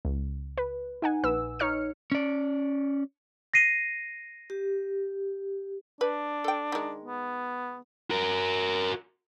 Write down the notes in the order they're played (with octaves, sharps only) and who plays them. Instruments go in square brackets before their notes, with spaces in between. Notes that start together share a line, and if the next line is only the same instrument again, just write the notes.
[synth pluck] C#2
B4
D#4 F#5 G#5
A#1 B4 E6
D#4 C#5 F6 C#7
[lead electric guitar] C#4 D5
[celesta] A#6 C7 D#7
[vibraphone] G4
[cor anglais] D4 [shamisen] B4
[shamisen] A4 G5
D#3 G#3
[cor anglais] B3
[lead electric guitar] F#4 A#4